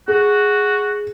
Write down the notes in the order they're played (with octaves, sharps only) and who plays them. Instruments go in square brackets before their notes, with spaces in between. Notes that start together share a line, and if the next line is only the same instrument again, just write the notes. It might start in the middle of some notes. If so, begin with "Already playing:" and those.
[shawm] F#4 [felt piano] G#4